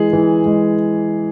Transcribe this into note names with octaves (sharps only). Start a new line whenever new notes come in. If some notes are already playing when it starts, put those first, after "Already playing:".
Already playing: E3 G#3 G#4
E3
G#3